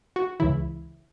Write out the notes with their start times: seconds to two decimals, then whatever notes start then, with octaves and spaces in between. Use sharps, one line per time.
0.16 F#4
0.40 C#2 C#3 E3 E4